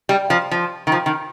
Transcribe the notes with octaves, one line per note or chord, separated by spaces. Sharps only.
G3
F3
F3
D#3
F3
D#3